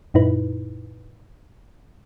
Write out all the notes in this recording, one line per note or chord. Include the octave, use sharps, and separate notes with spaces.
F#2 A#2 D#4 E4 B4